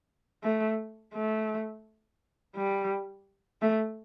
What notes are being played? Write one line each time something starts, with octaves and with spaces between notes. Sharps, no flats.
A3
A3
G3
A3